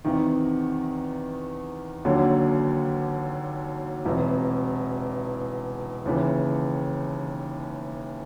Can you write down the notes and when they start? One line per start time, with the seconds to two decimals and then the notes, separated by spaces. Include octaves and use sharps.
0.05 E2 C3 D#3
2.05 D#2 D3 F#3 A#3
4.05 E1 E2 C3
6.05 D#2 C#3 E3